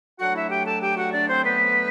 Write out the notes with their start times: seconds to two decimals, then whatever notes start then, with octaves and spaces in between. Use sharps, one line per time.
0.19 D3 F#3 A3 D4 F#4 F#5
0.35 E4 E5
0.50 G4 G5
0.66 A4 A5
0.82 G4 G5
0.97 F#4 F#5
1.13 D4 D5
1.28 C4 C5
1.44 B3 B4